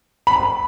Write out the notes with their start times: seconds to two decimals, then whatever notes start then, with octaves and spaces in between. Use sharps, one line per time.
0.27 B5